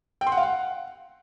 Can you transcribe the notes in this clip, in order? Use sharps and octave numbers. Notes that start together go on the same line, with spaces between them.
G5
C6
F#5
F5
F#5